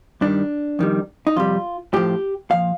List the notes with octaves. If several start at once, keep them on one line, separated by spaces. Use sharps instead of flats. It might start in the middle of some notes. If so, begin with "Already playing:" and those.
G2 D#3 G3 D4
F2 D#3 G3
D#4
F2 C3 G3 F4
A2 F3 G4
A#2 F3 F5